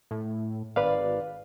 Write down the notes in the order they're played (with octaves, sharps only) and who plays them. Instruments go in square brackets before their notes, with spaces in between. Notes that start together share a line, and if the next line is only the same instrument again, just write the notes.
[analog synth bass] A2
[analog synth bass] G#1 [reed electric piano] B4 D5 F5